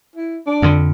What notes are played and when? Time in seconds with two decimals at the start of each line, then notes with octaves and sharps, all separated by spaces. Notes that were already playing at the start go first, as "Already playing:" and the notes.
0.16 E4
0.47 D4
0.62 F2 D3